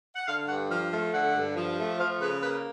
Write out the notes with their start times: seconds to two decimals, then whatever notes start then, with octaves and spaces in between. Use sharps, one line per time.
0.16 F#5
0.27 D3 F5
0.48 G2 F#5
0.70 F3 F5
0.92 A3 F5
1.13 D3 F#5
1.35 G2
1.56 F3
1.78 A3
1.99 F3 F5
2.21 C#3 B4
2.42 A#3 B4